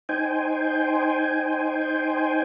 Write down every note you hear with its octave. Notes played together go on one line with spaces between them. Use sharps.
D#4 C5 G5 G#5